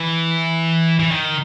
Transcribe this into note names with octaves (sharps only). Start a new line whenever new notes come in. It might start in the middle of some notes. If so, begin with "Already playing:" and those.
Already playing: E3
E3
D#3